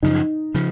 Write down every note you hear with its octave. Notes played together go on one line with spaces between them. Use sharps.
F#2 C#3 F3 D#4
C#3 F3